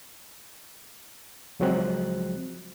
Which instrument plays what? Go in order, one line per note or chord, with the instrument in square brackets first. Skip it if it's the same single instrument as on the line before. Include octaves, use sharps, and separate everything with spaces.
[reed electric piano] C#2 F3 F#3 G#3 C4 F#6